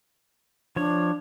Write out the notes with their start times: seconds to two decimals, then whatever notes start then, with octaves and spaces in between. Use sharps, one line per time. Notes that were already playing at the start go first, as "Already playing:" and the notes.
0.76 F3 D4 C#5